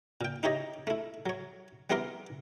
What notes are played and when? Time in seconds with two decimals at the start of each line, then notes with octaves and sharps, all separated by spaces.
0.21 A#2 G5
0.43 D#4 E4 G4 C#5 D#5
0.87 A3 E4
1.26 F#3 C#5
1.90 G3 B3 E4 A#4 C6 D6